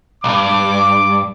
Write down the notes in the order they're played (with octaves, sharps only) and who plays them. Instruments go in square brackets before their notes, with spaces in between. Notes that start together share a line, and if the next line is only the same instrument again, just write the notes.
[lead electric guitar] B1 G2 [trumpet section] D6